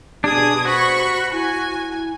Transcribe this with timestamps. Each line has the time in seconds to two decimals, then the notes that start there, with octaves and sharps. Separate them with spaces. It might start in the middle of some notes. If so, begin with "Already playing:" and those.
0.24 B2 D4 G4 G#4 D#6 G#6
0.65 F#4 C5 B5 C#6
1.32 E4 G#5